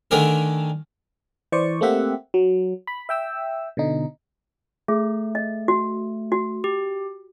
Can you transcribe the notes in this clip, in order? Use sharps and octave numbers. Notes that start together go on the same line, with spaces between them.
D3 D#3 A3 D4 G#4 A#4
E3 C5 D5 C#6
A3 A#3 C4 G4 E5 F#5
F#3
B5
E5 G5 E6
B2 D3 D#4
A3 G#4
D#5
F#4
F#4
G4